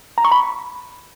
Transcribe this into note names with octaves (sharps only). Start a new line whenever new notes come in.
A#5
C#6
B5